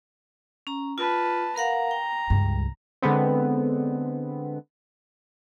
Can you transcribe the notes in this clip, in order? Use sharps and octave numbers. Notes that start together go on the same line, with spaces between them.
C#4 A#5
F4 B4 A5
A#4 F5 F#5 A#5
G5
C#2 G2
D3 G#3 B3 C4